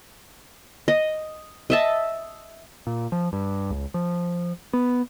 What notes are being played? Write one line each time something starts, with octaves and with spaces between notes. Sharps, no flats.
D#5
D#5 E5 A5
A#2
F3
G2
C#2
F3
B3